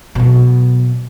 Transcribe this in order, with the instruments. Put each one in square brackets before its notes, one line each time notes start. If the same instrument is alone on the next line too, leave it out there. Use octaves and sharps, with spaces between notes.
[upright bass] B2 F#3